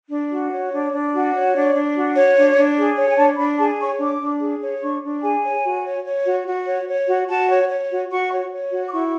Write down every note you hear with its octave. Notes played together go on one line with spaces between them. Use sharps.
D4
F#4
C#5
D4
D4
F#4
C#5
D4 D5
D4
F#4
C#5
D4
D4
G#4
C#5
G#5
D4 A5
D4 B5
G#4 A5
C#5 C#6
D4 D6
D4
G#4
C#5
D4 C#6
D4
G#4 G#5
C#5
F#4
C#5
C#5
F#4
F#4
C#5
C#5
F#4
F#4 A5
C#5
C#5
F#4
F#4 C#6
C#5
C#5
F#4
D6
E4 C#6